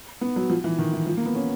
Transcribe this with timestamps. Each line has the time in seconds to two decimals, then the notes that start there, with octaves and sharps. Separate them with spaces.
0.21 B3
0.36 F#3
0.50 F3
0.64 E3
0.79 D#3
0.93 E3
1.07 F3
1.17 A#3
1.26 B3
1.35 C#4